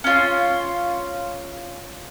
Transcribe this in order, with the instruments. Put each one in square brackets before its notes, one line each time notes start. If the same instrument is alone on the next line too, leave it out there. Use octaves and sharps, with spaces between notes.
[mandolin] C#4 F4